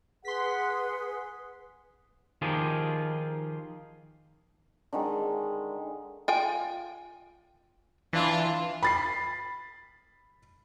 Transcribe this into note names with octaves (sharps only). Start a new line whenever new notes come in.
G#4 B4 F#5 C6 B6
D#3 F3 F4 G4 G#4
D3 D#3 G#3
F4 G5 G#5
E3 D4 F4
B5 A6 C7